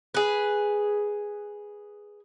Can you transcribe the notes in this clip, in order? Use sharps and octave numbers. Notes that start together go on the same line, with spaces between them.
G#4 B4